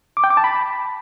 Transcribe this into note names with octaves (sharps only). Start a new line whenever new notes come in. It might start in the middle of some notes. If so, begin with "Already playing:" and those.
D6
G5
D6
A5
B5